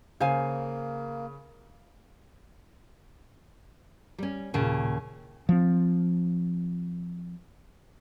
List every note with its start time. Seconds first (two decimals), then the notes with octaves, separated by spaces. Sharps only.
0.20 C#3 A#3 C5 F5 G#5
4.18 G3 C#4
4.54 D#2 A#2 C#3 A5
5.49 F3 C4